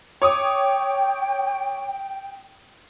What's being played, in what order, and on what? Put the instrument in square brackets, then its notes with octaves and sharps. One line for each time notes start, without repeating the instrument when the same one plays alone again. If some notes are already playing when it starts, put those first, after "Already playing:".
[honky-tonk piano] C#5 D6 D#6 [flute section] G5